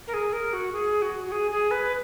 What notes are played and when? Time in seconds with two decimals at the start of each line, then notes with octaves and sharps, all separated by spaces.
0.07 A#4
0.14 G#4
0.33 A#4
0.53 F#4
0.73 G#4
1.02 F#4
1.27 F#4
1.32 G#4
1.51 G#4
1.71 B4